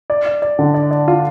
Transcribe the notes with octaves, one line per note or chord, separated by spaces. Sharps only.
D5
D5
D5
D3
D5
D5
F4